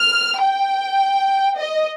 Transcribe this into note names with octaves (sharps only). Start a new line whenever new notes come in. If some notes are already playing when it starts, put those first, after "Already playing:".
Already playing: F6
G5
D#5